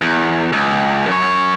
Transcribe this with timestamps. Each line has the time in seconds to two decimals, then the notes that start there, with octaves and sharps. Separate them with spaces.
0.02 E2
0.52 C#2
1.07 F#2 C#5